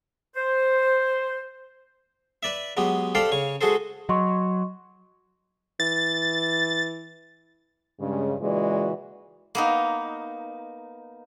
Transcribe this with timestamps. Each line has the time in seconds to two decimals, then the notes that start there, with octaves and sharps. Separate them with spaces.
0.36 C5
2.43 B4 D5 E5
2.77 F#3 G#3 B3 G4
3.15 G4 A4 C5 D5 F5 G5
3.31 C#3 C#5 C#6
3.61 G#3 F#4 G#4 A4 C5
4.09 F#3 D#5 C6 C#6
5.80 E3 A6
8.00 G2 C#3 G#3
8.41 A#2 C#3 E3 G#3 F#4 D5
9.55 A#3 B3 D#4